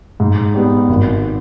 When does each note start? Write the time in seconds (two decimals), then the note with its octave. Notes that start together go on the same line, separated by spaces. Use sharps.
0.20 G#2
0.54 G3 B3
0.89 G#1